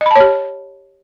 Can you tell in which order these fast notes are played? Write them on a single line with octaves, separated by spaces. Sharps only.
D#5 B5 A5 C#5 G4